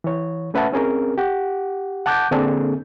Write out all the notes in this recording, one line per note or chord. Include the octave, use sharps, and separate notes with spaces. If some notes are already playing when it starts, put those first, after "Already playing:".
E3 C#5
A3 C#4 B4 E5 F#5 A5
C4 C#4 G#4 A#4
G4 F#5
F#5 A5 D6 F#6 G6
D3 A#3 C4 D4 G#4 A4